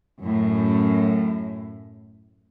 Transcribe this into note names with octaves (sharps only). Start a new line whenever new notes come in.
F#2 A2